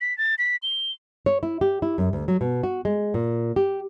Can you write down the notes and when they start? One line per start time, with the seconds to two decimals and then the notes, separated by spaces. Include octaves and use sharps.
0.01 B6
0.18 A6
0.38 B6
0.62 G7
1.26 C#5
1.43 E4
1.61 G4
1.82 E4
1.98 F#2
2.13 D2
2.28 F#3
2.41 B2
2.63 F#4
2.85 G#3
3.14 A#2
3.56 G4